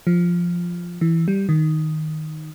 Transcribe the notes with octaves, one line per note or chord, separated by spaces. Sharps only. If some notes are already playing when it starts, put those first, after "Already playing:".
F3
E3
G3
D#3